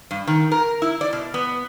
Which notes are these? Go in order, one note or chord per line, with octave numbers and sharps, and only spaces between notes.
G2
D#3
A#4
E4
D5
B2
B3